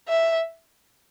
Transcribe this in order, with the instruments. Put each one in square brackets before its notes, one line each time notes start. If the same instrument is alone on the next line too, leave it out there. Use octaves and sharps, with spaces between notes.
[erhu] E5